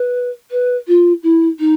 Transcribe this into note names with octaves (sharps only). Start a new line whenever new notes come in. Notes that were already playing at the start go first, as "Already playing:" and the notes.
Already playing: B4
B4
F4
E4
D#4